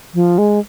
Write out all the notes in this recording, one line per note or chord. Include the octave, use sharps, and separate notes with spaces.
F3
G#3